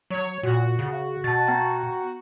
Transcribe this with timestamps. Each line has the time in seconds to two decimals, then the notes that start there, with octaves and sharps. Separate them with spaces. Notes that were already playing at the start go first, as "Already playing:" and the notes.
0.10 F#3 C#5
0.43 A#2 F#4
0.79 C#3
1.24 B2 A5 A6
1.47 B3 G5 A#5